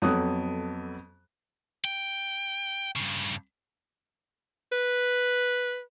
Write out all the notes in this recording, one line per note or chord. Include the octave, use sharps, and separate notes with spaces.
F2 F#3 B3 A4 D#6 F#6
G5
G2 C#3
B4